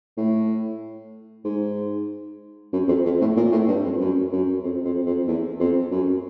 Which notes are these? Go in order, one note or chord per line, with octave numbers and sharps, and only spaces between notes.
A2
G#2
F#2
F2
F2
A2
A#2
A2
G2
F2
F#2
F#2
F2
F2
F2
E2
F2
F#2